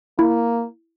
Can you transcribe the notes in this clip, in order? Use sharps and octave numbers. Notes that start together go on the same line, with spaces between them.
A#3 E4